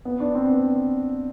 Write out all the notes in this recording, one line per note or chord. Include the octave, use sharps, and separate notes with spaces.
B3
D4
C4
B3